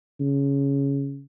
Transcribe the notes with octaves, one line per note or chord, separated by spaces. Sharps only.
C#3